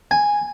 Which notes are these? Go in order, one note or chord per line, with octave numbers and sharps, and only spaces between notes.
G#5